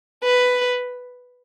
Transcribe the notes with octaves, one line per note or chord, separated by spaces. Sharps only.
B4